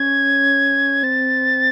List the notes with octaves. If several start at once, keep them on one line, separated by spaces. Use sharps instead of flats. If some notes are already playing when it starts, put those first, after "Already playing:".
Already playing: C#4 G#6
C4 A6